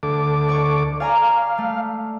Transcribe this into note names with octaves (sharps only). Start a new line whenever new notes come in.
D2 A4 D6
D5 C#6
D5 F5 G#5 A#5
A3